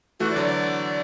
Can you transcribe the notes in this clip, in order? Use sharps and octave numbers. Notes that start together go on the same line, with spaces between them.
E3 A3 F#4
D5
D3 F#3
D5